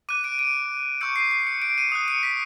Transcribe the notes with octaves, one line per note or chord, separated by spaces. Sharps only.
D6 F#6 D#7
D7
D7
C#6 E6 G6 C#7
C7
C7
C#7
D7
D#7
D#6 F#6
C#7
B6